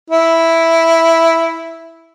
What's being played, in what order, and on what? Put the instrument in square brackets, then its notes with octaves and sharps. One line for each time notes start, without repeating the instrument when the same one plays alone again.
[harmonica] E4